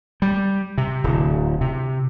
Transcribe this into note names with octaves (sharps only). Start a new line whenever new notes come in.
G3
C3
D1
C3